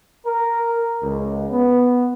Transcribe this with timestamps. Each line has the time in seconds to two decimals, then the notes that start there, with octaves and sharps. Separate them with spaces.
0.25 A#4
1.01 C#2
1.50 B3